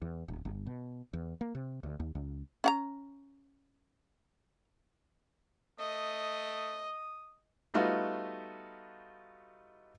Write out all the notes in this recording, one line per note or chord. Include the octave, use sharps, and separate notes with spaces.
E2
D1
G1
B2
E2
A#3
C3
D2
D#2
C#2
C#4 F#5 A#5
A3 D#5 D#6
G3 A3 B3 D#4 F4 F#4